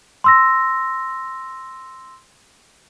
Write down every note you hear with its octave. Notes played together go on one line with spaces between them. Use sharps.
C6 E6 A#6